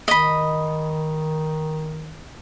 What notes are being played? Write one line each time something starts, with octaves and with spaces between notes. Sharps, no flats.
D#3 D#5 B5